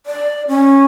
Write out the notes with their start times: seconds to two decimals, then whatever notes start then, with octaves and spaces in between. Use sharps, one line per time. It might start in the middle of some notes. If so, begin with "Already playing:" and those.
0.06 D5
0.48 C#4